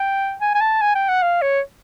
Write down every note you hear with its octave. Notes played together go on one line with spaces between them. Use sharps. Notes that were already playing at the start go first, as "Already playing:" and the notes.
Already playing: G5
G#5
G#5
A5
G#5
G5
F#5
F5
C#5